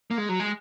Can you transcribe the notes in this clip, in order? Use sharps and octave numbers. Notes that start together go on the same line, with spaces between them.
A#3
G#3
F#3
G#3